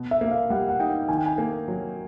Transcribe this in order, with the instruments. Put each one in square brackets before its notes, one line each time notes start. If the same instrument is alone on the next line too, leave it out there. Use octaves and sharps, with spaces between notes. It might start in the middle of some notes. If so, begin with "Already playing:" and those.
Already playing: [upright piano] B2
[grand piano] E5
[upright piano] A#3
[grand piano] F5
[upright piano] G3 [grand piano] F#5
[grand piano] F#5
[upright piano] D#4 [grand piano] G5
[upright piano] D#3 [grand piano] G#5
[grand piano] G5
G#5
[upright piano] A#3
F#3